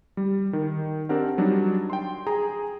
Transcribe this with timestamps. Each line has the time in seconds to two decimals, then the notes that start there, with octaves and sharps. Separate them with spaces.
0.17 G3
0.53 D#3
1.09 C4 D4 G4 A#4 F#5
1.38 F#3 G3 D4 D#4
1.90 G5 C6
2.27 G#4 A#5